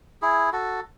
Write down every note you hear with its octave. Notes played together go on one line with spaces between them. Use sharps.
E4 G#4
F#4 A4